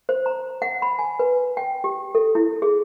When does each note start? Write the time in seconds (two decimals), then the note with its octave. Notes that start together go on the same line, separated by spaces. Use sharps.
0.09 C5
0.26 A#5
0.62 F#5
0.82 B5
0.99 G#5
1.19 B4
1.57 G5
1.84 G4
2.15 A4
2.35 E4
2.62 G#4